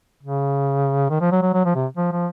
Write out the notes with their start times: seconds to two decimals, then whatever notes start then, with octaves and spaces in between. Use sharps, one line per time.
0.23 C#3
1.09 D#3
1.21 F3
1.32 F#3
1.42 F#3
1.53 F#3
1.65 F3
1.75 C3
1.97 F3
2.12 F3